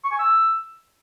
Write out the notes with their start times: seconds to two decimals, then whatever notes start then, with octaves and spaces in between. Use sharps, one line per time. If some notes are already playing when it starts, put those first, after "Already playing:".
0.04 C#6
0.12 G#5
0.19 E6